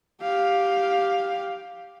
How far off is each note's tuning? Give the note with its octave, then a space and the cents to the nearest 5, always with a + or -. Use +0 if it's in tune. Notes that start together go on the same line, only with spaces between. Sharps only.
G4 +0 F5 +10